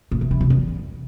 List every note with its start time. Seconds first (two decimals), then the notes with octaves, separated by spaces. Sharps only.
0.11 A#2
0.21 C3
0.31 E3
0.41 C3
0.50 E2